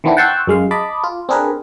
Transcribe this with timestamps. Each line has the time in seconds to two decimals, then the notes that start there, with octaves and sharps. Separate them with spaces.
0.04 D#3 E3 B3 C4 D4 E4
0.17 F#5 G5 A5 C6 C#6 E6
0.47 F#2 G#3 F5
0.71 D#5 A5 B5 D6
1.04 F4
1.29 C4 D4 G#4 A#4 B4